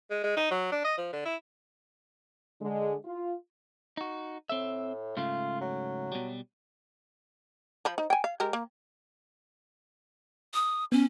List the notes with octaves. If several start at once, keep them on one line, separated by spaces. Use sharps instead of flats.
G#3
G#3
D#4
F#3
D4
D#5
F3
D3
E4
D3 G#3
F4
D#4 F#4
A2 C4 E5
G#2 C#3 A3 F4
F#3
B2 G3
F3 C5 B5
D#4
G5 G#5
F5
G#3 G4 A#4
A#3
D#6
B3 C#4